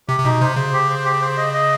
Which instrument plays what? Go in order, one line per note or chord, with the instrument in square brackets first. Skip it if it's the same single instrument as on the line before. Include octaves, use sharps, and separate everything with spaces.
[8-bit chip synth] C3 [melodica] G4
[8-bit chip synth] C3
[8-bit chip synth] B2 [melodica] D#4
[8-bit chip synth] C3 [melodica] C5
[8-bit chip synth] C#3 [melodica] C5
[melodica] G4
C5
G4
C5
D#5
D#5